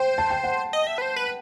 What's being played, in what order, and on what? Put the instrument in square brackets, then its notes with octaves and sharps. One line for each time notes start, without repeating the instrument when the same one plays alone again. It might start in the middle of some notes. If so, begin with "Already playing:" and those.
Already playing: [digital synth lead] C5 [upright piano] G5
[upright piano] A5
G5
F#5
[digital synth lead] D#5
E5
B4
C5
B4